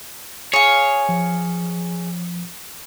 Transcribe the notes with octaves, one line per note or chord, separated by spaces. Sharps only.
G#4 C#5 F5
F3